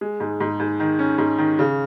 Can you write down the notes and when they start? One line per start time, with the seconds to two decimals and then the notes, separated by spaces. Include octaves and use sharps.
0.01 G#3
0.20 G#2
0.40 G#2
0.60 G#2
0.80 D#3
0.99 C#4
1.18 G#2
1.38 D#3
1.59 C#3